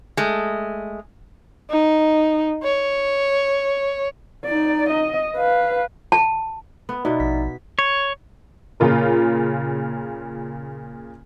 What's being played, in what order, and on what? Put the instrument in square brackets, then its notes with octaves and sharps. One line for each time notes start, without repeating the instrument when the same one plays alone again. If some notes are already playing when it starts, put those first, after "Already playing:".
[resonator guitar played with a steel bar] G#3 A3
[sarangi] D#4
C#5
[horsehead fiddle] D#4 D5
D#5
B4 F5
[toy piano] A5
[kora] B3
[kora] B2 B3 [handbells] D#4 D5 E5
[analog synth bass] A#1 [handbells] B6
[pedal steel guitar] C#5
[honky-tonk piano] A#2 C#3 F4 A#4